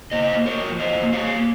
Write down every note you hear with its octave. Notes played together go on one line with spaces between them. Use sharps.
A#3 C5 D#5
A#3
A#4 C#5
F3
F2 C5 D#5
A#3
C#5 F5
A#3